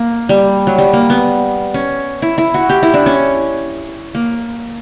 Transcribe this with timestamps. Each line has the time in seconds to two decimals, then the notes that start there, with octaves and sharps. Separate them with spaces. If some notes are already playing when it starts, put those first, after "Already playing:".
Already playing: A#3
0.29 G3
0.67 F#3
0.78 G3
0.93 A#3
1.10 B3
1.74 C#4
2.22 E4
2.38 E4
2.54 F#4
2.69 G4
2.83 E4
2.94 D4
3.06 C#4
4.15 A#3